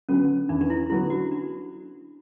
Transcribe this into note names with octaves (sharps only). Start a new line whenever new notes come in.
D3 F#3 B3 C#4
E2 D4
D4
E4
D3 F#3 B3 E4
F#4
D4